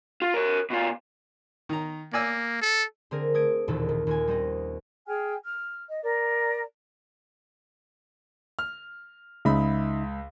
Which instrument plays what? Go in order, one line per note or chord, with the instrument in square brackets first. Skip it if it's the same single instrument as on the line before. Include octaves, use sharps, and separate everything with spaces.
[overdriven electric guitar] F4
A#4 C#5
B2 F4
[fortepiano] D#3 A#5
[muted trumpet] A#3 [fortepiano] D5 G#5 E6
[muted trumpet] A4
[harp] D3 C4 G#4 A#4
A3 D#6 G#6 D7
E1 D#2 A#2 D#3 A4
D#3
D#2 F4 G#5
G3 C4 C#4 D#5
[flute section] G#4 G5 G#5 F6
F6
D#5
A#4 D5
[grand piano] F6
[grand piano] C#2 B5 [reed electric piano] C#3 D#4 E5